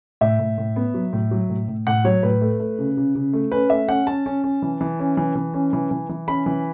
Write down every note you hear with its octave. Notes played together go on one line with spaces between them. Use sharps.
A2 E5
A2
A2
B3
F#3
A2
F#3
A2
A2
A2 F#5
F#3 C#5
A2 B4
A3
A3
C#3
C#3
C#3
A3
C#4 B4
A3 E5
C#4 F#5
C#4 A5
C#4
C#4
E3
E3
C#4
E3
E3
C#4
E3
E3
E3
C#4 B5
E3